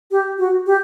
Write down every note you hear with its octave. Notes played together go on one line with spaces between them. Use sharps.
G4
F#4
G4